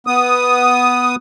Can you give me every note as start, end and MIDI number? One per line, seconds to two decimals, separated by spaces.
0.07 1.16 59
0.07 1.16 87